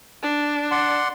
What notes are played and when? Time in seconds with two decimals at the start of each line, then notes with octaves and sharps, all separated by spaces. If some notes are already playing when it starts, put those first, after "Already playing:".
0.23 D4
0.71 D5 F#5 C6